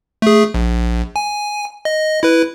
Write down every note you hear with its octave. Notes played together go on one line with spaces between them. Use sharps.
A3 G#4
A#1
G#5
D#5
E4 B4